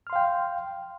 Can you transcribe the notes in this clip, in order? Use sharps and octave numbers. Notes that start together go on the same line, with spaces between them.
F5 G5 C6 F6